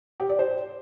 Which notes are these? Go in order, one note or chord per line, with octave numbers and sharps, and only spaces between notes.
G4
D5
C5